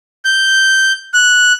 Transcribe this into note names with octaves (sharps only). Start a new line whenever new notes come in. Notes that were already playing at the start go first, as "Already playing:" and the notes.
G6
F#6